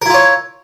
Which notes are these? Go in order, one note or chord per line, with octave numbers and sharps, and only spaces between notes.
E4 F4 A#4 C#5